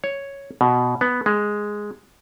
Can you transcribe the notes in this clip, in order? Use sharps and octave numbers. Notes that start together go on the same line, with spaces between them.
C#5
B2
B3
G#3